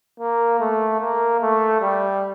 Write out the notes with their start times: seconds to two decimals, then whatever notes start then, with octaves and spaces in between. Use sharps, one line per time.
0.20 A#3
0.60 A3
1.01 A#3
1.41 A3
1.82 G3